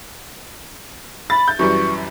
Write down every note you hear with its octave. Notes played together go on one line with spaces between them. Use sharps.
B5 A6
G6
F#2 E3 G3 C#6